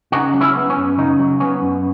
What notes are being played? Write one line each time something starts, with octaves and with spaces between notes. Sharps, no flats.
C#3 D#4 F#4
F#3
C#4 E4
B3
C#4
F#2
C#3 D#4
F#3
B3 C#4
F#2